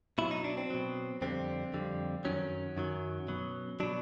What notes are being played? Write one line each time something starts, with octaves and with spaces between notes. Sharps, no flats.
B2 F#3 E4
D#4
D4
C4
B2 F#3
F2 D3 G3 C4
F2 D3 G3
F#2 D#3 F#3 C#4
F#2 D#3 F#3
B2 F#3
B2 F#3 D4